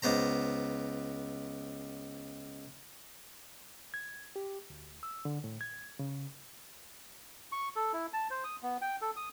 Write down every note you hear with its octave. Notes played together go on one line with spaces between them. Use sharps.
C#2 B3 C5 A#5
G#6
G4
D2
E6
D3
A2
G#6
C#3
C#6
A4
E4
A5
C5
D#6
B3
G5
A4
D#6